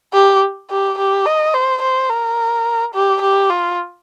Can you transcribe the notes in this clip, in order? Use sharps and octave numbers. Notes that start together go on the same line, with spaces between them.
G4
G4
G4
D#5
C5
C5
A#4
G4
G4
F4